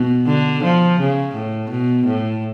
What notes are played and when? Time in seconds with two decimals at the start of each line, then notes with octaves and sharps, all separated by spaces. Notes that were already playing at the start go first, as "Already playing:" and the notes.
Already playing: B2
0.27 D3
0.63 F3
0.99 C#3
1.34 A2
1.70 B2
2.06 A2